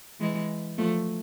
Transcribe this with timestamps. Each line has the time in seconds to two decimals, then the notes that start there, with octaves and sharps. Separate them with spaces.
0.20 E3 G#3
0.78 F3 A3